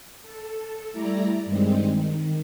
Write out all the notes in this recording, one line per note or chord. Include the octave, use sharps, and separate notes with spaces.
A4
G3 A3 E4 D5 A#5
G2 D#3 G3 G#3 C4
D#3